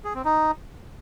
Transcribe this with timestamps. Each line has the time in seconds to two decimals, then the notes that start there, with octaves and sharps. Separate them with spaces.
0.05 G#4
0.15 C4
0.25 D#4